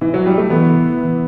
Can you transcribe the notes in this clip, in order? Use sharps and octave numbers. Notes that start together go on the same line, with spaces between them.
E3
F#3
G3
A3
E3 B3